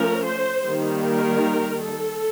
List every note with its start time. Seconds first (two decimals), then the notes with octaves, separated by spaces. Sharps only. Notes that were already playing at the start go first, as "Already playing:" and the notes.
Already playing: F3 A3 C#4 A#4
0.25 C5
0.64 D#3 G3 A#3
1.04 A#4
1.83 A4